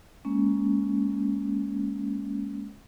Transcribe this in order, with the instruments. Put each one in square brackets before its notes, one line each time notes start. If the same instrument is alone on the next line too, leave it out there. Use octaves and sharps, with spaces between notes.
[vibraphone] G#3 A#3 C#4